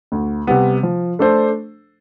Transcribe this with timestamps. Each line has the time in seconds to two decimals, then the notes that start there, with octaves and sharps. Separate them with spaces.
0.12 D2
0.47 C3 G3 B3
0.83 F3
1.19 A3 D4 A4 C5